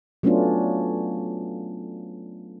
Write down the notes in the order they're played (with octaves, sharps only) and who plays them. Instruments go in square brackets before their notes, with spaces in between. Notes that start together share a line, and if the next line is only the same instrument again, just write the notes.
[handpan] F#3 A3 B3 C#4 D4 F4